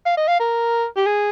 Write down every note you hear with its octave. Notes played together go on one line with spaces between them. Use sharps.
F5
D#5
F5
A#4
G4
G#4